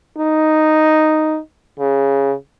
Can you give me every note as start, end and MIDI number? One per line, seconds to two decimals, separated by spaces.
0.18 1.39 63
1.79 2.33 49